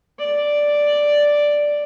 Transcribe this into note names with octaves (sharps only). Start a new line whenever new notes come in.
D5